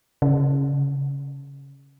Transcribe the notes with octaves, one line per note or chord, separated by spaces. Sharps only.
C#3